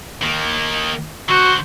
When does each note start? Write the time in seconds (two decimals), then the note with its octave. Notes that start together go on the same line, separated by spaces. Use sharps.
0.22 D#3 A#3
1.29 D3 F#4 C5